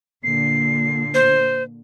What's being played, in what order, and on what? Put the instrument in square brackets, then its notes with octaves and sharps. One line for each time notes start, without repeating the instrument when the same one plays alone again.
[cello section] A#2 D3 [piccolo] C7
[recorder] C5